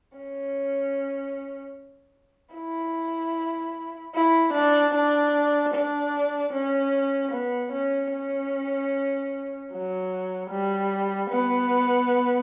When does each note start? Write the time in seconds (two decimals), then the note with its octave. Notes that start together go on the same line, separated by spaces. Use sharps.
0.17 C#4
2.55 E4
4.15 E4
4.54 D4
4.95 D4
5.74 D4
6.53 C#4
7.32 B3
7.73 C#4
8.12 C#4
9.72 F#3
10.50 G3
11.30 B3